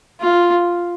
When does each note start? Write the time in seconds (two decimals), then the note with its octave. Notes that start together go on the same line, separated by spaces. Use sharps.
0.20 F4